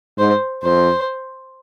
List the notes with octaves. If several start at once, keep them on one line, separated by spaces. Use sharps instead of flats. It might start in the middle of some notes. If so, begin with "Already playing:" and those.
G#2 C5
F2 C5